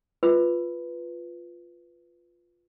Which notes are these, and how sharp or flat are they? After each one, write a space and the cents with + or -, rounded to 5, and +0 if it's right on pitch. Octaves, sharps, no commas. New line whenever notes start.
F4 +0 B4 +0